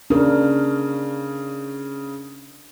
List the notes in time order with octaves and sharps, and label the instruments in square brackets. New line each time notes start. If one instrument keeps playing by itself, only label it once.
[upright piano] C#3 [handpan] D4 A#4